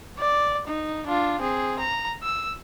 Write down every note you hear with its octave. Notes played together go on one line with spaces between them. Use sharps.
D5
D#4
D4 F4
C4 G#4
A#5
E6